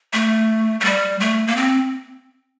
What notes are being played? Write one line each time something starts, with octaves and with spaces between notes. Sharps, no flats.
A3
A3
G3
A3
A#3
C4